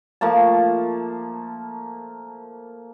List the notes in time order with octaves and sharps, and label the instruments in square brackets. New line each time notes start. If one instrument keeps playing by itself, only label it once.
[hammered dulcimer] F3 A3 A#3 A5